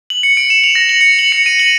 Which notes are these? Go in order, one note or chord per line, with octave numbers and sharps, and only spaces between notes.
F#7
C#7
D7
E7
F7
A#6
F#7
C#7
F#7
C#7
D#7
F#7